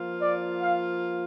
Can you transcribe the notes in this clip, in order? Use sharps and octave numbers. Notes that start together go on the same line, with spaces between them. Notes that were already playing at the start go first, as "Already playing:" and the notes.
Already playing: F3 A#3 F4
D5
F5